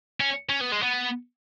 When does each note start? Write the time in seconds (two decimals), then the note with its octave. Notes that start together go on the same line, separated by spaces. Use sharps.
0.20 C#4
0.50 C#4
0.61 B3
0.72 G#3
0.83 B3